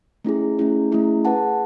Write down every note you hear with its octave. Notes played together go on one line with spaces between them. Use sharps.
A3 C#4 E4 G#4
A3 C#4 E4 G#4
A3 C#4 E4 G#4
G#4 B4 F#5 A5